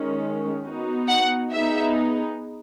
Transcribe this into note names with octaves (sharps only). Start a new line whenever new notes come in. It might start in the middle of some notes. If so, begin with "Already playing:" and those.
Already playing: D#3 G#3 C#4
B3 D#4 F#4
F#5
B3 D#4 G#4 E5